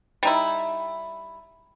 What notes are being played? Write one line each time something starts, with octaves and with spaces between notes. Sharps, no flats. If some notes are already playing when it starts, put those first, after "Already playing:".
G3 D#4 E4